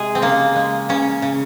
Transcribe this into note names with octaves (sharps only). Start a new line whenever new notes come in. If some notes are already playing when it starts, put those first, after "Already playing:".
Already playing: C3 G#3 G#4
C4
C#3 A#3
G#3
C#3 C#4
C#3